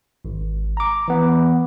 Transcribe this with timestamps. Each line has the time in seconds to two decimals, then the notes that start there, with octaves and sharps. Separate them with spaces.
0.25 G#1
0.77 A#5 D6
1.08 E3 B3